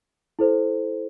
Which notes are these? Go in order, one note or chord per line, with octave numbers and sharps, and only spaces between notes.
E4 A4 C5